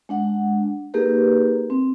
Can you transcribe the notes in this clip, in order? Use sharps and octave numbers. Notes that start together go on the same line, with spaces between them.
G#3 D4 F#5
A#3 D#4 G4 G#4 A#4 B4
C4